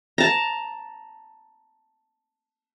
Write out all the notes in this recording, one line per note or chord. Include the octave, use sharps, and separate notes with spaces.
A5 A#5